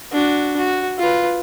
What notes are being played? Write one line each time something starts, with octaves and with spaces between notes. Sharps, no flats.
D4 F#4
F#4
F4 B4